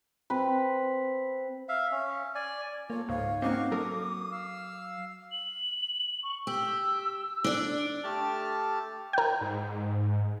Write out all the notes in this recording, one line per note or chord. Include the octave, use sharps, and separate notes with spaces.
C4 B4
E5 F5
C#4
D5 G#5
A#3 F4 A4 C#5
C#2 G#2 C#5 F5
A#3 C4 C#4 D#4 F#4 F5 C#6 D6
F#3 A4 A#4 D#6
F5 E6
F#7
C#6
G4 E6
D4 D5
A3 G4 A5 F6
A#4 G5
G#2